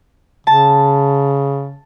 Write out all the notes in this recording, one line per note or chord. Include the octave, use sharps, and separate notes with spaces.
C#3 A5